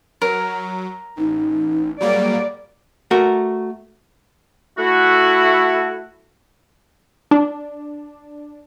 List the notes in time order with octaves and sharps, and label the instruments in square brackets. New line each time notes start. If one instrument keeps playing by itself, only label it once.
[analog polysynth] F#3 [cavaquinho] A#4
[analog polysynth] A1 [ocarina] D#4
[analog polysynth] F#3 G3 A#3 [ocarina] G#4 [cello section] D5
[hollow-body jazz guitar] A3 F#4 A#4
[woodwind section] A3 E4 F#4
[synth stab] D4